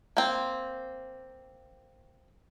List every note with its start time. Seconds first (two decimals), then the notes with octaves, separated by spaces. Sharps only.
0.17 A#3 C4